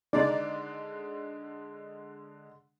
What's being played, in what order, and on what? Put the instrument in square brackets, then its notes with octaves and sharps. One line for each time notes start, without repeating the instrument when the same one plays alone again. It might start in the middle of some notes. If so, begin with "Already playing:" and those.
[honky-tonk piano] D3 G#3 D4 [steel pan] D#4 D5